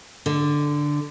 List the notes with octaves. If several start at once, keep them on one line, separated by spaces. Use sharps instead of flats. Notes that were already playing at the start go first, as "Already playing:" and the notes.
D3